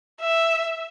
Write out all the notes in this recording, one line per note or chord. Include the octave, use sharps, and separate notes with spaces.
E5